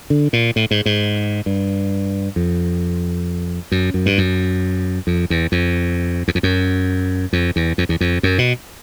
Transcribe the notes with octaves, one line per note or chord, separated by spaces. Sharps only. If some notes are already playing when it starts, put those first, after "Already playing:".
D3
A#2
A2
G#2
G#2
G2
F2
F#2
F#2
G2
F#2
F2
E2
F2
E2
F2
F#2
F2
E2
F2
E2
F2
F#2
B2